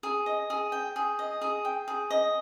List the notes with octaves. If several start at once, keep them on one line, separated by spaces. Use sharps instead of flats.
G#4
D#5
G#4
G5
G#4
D#5
G#4
G5
G#4
D#5